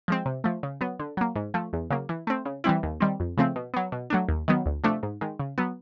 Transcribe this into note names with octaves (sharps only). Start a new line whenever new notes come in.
F3 G#3 C4
C3
F3 A3
C#3
F#3 B3
D3
F#3 A#3
G#2
F3 A3
E2
C#3 F#3 A#3
E3
A3 C4
C#3
E3 G3 C4 E4
D#2
D#3 G3 C4
F2
C#3 F3 A3 C4
B2
F#3 B3
B2
F#3 A3 D4
D#2
D#3 F#3 B3
D2
C3 F3 A3 D4
G#2
D#3 G#3
C#3
F#3 B3